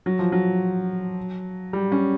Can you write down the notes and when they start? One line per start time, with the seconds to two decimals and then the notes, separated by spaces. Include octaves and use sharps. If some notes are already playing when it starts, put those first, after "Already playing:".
0.06 F#3
0.19 F3
0.32 F#3
1.73 G3
1.92 C#4